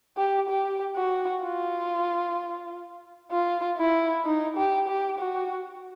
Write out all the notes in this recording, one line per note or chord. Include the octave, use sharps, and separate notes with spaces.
G4
G4
F#4
F4
F4
E4
D#4
G4
G4
F#4